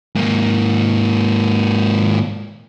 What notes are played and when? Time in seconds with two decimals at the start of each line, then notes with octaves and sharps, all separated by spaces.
0.15 G#2 A#3